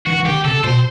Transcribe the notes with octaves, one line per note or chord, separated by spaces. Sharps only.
E3 F#4
E3
D#3 G4
C#3 A4
B2 C5